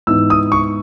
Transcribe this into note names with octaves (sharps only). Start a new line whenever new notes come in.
G#2 E3 B3 D#4 E6
D#6
C#6